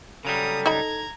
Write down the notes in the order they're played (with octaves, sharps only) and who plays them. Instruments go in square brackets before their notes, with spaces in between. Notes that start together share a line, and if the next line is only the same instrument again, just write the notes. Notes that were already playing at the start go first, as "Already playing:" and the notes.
[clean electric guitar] C#3 F#3 G3 [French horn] A4 [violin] A#5 D#6
[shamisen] D#4 B5 [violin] A#5 G#6